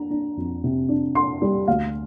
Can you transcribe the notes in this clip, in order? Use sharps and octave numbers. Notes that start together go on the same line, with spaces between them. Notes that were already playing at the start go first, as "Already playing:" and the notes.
Already playing: D4 A#5
D4
F2
C3
D4
D4 C6
G3
D2 F5